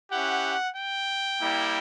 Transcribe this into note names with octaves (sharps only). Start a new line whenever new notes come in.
C#4 E4 G4 F#5
G5
G3 A#3 E4